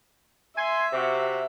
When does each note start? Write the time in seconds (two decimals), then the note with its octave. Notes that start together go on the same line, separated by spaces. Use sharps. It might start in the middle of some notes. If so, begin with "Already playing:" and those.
0.58 E5 G#5 C6
0.93 C3 F#4